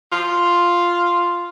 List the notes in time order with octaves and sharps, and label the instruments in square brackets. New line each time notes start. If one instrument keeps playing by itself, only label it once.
[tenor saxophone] F4